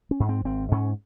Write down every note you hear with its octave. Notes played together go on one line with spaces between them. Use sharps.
C#4
G#2
C4
G#1 C4
G#2 C#4